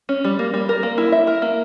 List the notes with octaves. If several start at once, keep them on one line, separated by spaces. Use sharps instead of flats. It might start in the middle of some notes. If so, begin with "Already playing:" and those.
C#4
G3
A#3
G3
A#4
A#3
E4
E5
A#4
A#3